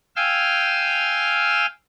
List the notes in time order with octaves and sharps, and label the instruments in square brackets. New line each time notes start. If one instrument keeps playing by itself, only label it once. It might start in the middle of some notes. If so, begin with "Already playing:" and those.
[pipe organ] F5 G5 G#5 E6 F6